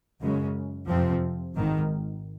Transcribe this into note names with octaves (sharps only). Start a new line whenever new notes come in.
F#2 C#3 G#3 C#4
F2 C3 F3 C4
G#1 G#2 D#3